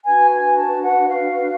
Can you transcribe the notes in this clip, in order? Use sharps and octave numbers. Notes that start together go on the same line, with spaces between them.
D4 F#4 B4 G#5
G#5
A5
F#5
F5